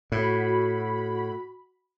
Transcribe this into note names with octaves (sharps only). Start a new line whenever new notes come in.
A2 F#4 B5